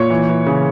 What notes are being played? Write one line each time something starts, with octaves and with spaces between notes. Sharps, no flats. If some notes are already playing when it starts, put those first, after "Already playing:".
Already playing: A#2 C#5
E3
E3
C#3